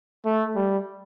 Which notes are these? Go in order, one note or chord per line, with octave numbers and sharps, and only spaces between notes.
A3
G3